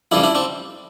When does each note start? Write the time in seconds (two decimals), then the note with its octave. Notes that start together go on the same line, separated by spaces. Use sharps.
0.12 F2 C#3 E3 G3 D4 E4
0.23 D4 E4
0.35 C4 D4